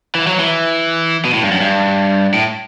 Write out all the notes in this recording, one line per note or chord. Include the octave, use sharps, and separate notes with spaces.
E3
F#3
E3
B2
A2
G2
F#2
G2
A2